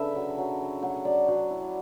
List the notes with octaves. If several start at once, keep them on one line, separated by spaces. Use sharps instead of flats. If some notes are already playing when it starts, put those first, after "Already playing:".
Already playing: C#3 D4 A4 B4 E5
F#3
F#3
F#3
F#3 F#5
F#3 D5
F#3
E4